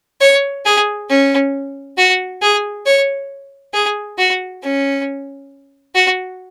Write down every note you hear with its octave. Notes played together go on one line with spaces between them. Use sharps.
C#5
G#4
C#4
F#4
G#4
C#5
G#4
F#4
C#4
F#4